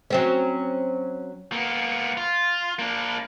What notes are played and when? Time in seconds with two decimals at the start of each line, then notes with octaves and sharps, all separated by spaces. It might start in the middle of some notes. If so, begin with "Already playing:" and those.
0.10 F#3 C4 C#4
1.52 A#3 B3
2.17 F4
2.79 A#3 D4